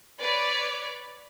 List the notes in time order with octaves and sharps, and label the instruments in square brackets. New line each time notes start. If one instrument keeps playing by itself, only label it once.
[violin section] B4 C#5 D5